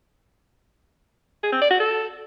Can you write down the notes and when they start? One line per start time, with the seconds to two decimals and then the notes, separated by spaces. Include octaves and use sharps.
1.43 G#4
1.52 C4
1.62 D5
1.71 F#4
1.80 A4